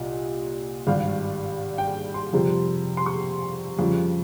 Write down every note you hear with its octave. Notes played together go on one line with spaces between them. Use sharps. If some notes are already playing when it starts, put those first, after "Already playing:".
Already playing: C2 A#2 D#5
G#1 G2 G3 F5
G5
C6
F2 C3 G3
C6
C#6
F2 C#3 G3